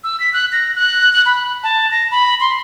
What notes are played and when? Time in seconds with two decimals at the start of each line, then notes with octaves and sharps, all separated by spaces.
0.04 E6
0.20 B6
0.33 F#6
0.52 A#6
0.76 F#6
1.13 F#6
1.26 B5
1.63 A5
1.91 A#6
2.11 B5
2.40 C6